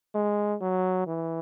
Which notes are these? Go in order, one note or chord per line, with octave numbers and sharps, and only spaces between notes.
G#3
F#3
E3